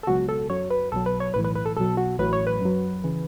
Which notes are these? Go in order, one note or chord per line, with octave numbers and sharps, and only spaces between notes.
A4
C#2 B2 F#3 F#4
A4
F#2 F#3 C#5
B4
B1 B2 F#3 A4
B4
C#5
B1 A2 E3 B4
B4
B4
A4
B1 B2 F#3 A4
F#4
A1 A2 F#3 B4
C#5
B4
F#2 F#3
C#3 E3